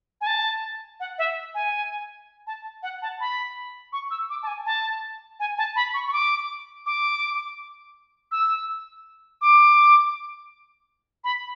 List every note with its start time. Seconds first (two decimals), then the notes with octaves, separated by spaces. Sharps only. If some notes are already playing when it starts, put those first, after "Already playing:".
0.21 G#5
0.27 A5
1.00 F#5
1.18 E5
1.55 G#5
2.47 A5
2.83 F#5
3.02 A5
3.20 B5
3.93 C#6
4.11 E6
4.30 D6
4.43 A5
4.47 G#5
4.66 A5
5.40 G#5
5.58 A5
5.76 B5
5.94 C#6
6.08 C#6
6.13 D6
6.86 D6
8.32 E6
9.41 D6
11.24 B5